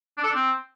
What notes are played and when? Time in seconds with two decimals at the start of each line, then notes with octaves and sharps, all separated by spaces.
0.18 D4
0.23 A4
0.29 D4
0.35 C4